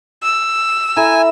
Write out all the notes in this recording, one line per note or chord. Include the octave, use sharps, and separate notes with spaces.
E6
E4 A4 G#5 A#5